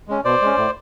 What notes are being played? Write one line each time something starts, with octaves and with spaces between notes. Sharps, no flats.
G#3 C#4
B2 C5 D5
G#3 C#4
A2